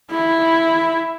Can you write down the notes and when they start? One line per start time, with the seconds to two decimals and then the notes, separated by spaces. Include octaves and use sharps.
0.11 E4